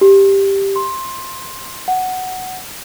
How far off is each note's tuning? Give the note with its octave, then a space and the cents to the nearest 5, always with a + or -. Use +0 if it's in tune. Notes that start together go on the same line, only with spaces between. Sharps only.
G4 +5
C6 +15
F#5 +5